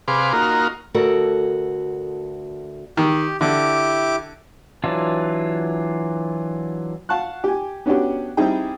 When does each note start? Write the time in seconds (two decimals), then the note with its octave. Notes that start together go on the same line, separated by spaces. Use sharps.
0.08 C3 G#4 B4 F5 C6 D6
0.33 A#3 D#4 F4 F#4 A#4
0.94 D2 F#4 A4 A#4
2.97 D#3 G4
3.41 D3 E4 G4 D6
4.84 E3 F#3 D4 F4
7.09 F5 F#5 A5 C#6 F#6
7.44 G4 G#5
7.86 B3 C#4 D4 F#4 G4
8.37 G3 C4 D#4 E4 G#4 G5